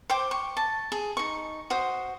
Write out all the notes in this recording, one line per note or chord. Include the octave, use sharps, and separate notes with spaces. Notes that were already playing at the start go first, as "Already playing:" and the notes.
C5 G5 D6
C#6
A5
G#4
D#4 C#6
F#4 C5 D#6